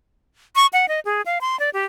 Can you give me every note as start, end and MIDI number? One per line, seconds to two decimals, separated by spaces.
0.56 0.66 85
0.73 0.88 78
0.88 1.00 75
1.05 1.22 68
1.26 1.39 77
1.41 1.59 84
1.60 1.70 74
1.73 1.85 67